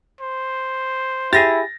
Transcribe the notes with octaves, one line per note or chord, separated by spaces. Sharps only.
C5
E4 G4 G#4 A6 A#6